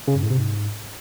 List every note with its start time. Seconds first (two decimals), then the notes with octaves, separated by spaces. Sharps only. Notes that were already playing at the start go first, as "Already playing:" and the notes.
0.08 C#3
0.15 G2
0.23 A2
0.30 C3
0.38 G#2